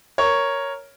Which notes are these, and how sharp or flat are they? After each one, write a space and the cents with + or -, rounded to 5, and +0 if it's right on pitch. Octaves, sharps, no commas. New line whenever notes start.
A#4 +0 C#5 +0